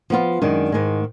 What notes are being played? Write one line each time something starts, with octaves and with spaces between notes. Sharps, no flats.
F3 B3 F4
F#2 D#3 G#3 D4
G#2 D#3 G#3